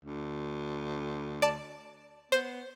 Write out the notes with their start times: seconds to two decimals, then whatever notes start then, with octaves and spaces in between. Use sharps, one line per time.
0.05 D2
1.42 D5 A5
2.32 B3 C5 G6